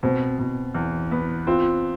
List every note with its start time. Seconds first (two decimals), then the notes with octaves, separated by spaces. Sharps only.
0.03 B2 C4
0.39 B2
0.74 E2
1.11 B3
1.47 C4 F4